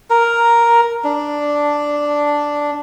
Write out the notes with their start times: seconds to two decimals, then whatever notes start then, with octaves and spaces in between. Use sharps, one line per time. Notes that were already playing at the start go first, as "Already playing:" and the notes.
0.10 A#4
1.04 D4